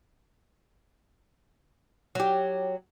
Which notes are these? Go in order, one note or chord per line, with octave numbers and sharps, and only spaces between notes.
F#3 G4